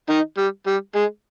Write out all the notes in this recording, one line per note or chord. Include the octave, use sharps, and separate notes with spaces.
D#3 D#4
G3
G3
G#3